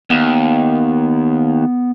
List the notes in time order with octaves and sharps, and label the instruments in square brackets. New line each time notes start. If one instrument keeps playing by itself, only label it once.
[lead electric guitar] D#2 [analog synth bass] B3